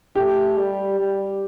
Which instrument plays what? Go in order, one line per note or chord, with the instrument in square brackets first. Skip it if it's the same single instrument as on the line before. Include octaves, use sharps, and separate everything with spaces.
[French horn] A3 [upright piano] G4
[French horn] G3
G3